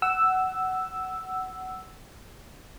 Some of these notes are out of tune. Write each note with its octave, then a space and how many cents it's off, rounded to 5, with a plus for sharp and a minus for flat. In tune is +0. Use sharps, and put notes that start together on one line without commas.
F#5 +15 E6 +0